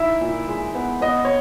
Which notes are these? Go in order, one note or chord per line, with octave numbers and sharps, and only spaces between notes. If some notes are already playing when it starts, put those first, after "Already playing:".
Already playing: D#4 E4 E5
A#2
G#3
B3
B3 D#5
C#5